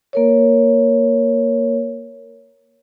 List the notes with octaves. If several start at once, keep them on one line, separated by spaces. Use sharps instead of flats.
A#3 A#4 C#5